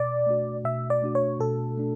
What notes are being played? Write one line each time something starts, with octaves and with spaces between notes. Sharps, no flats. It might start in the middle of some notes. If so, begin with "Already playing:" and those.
Already playing: B2 D5
A3 D4 F#4
B2 E5
D5
A3 D4 F#4
C#5
B2 A4
A3 D4